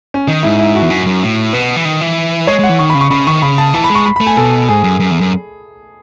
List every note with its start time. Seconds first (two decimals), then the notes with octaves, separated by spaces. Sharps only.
0.14 C#4
0.28 D#3 D#4
0.43 G#2 E4
0.59 E4
0.75 F#4
0.82 E2
0.90 F#2
1.06 F#2
1.22 A2
1.53 B2 B4
1.76 E3
1.85 D#3
2.01 E3
2.47 G#3 C#5
2.59 G#3 F#5
2.69 E3
2.79 D#3 C#6
2.90 B5
2.95 C#3
3.01 C#6
3.11 C#3 B5
3.27 D#3 C#6
3.42 C#3 B5
3.58 A5
3.74 E3 A5
3.84 B5
3.90 G#3
3.95 C#6
4.06 B5
4.16 A3 B5
4.27 G#5
4.37 B2 A4
4.69 G#2 G#4
4.84 F#2
5.00 F#2
5.11 E2
5.21 F#2